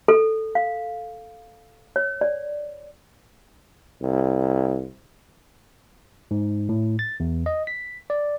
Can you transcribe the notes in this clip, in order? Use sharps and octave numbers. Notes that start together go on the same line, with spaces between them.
A4
F5
C#5
D5
C2
G#2
A2
A6
E2
D#5
B6
D5